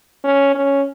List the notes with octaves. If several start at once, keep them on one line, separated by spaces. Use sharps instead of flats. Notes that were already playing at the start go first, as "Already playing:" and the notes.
C#4
C#4